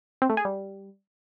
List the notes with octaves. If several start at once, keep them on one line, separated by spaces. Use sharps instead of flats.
C4
A3
G#4
G3